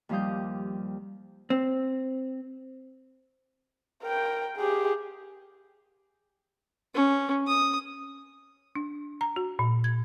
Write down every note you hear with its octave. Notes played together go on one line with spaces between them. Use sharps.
D#2 F3 G3 F5 D#6 G6
C4
A#4 G5
G4 G#4
C#4
D#6
D4
A#5
F#4
A#2
G#6